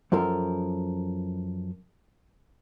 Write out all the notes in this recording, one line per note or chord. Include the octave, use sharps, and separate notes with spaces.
F#2 F3 A4 A#4